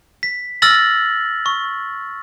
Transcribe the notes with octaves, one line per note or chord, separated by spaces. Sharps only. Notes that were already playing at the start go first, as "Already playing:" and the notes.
B6
E6 F6 A6 A#6 F#7
C#6